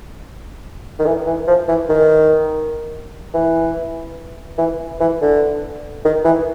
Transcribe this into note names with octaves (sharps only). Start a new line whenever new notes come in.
D#3
E3
E3
F3
E3
D#3
E3
E3
E3
D3
D#3
E3